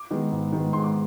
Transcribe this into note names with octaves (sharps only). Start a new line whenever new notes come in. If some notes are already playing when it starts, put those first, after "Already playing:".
Already playing: D6
D#3 G#3 B3
G#2
D#3 G#3 B3
G#2 C6
D6